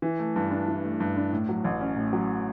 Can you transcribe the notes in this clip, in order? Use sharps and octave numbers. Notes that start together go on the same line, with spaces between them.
E3
A3
G2
D4
E3
A3
G2
D4
A2
F#3
A1
C#4
A2
F#3